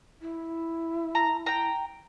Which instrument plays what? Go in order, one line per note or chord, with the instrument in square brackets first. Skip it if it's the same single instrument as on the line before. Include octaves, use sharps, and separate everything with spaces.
[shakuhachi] E4
[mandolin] A#5
G5 A#5